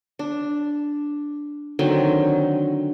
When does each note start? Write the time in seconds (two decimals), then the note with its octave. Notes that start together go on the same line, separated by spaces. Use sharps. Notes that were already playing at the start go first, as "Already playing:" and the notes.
0.19 D4
1.79 D3 D#3 F#3 C4